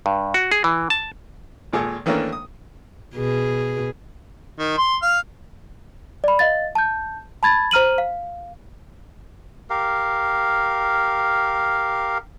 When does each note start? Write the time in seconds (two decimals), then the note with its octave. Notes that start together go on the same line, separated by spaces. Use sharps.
0.06 G2
0.34 F#4
0.52 G#4
0.64 E3
0.90 A5
1.73 G#1 A#2 G#4 A4 D#6
2.06 D#3 E3 A3 A#3 C#4 D4
2.33 D#6
3.16 B2 G#4
4.59 D#3
4.78 C6
5.02 F5
6.24 D5 B5
6.39 D#5 F5 A6
6.75 A5 G6
7.43 A5 B5 G#6 A6
7.71 C5 A#5 F6 D#7 F#7
7.98 F5
9.70 G4 A#4 F5